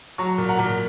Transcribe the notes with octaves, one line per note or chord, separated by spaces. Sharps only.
F#3 A#5 C#6
A#2
F#5 A#5
A#2